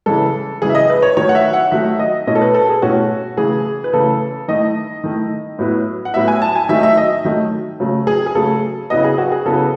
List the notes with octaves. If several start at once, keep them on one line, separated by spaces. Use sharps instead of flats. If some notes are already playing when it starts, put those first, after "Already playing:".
C#3 E3 G#3 A4
C#3 E3 G#3 G#4
E5
D#5
B4
C#5
D#3 F#3 A3 C#5
F#5
E5
F#5
D#3 F#3 A3 E5
D#5
B2 A3 C#4 E4 D#5
A4
B4
A4
G#4
B2 A3 C#4 E4 F#4
C#3 E3 A3 G#4
B4
C#3 E3 A3 A4
D#3 A3 E4 D#5
D#3 A3 E4
A2 F#3 B3 E4
F#5
A2 F#3 B3 E4 E5
G#5
A5
G#5
D#3 F#3 A3 D#4 E5
E5
D#5
D#3 F#3 A3 D#4
C#3 F#3 A3
G#4
G#4
C#3 F#3 A3 A4
C#3 F#3 B3 E4 D#5
G#4
F#4
G#4
C#3 F#3 B3 E4 A4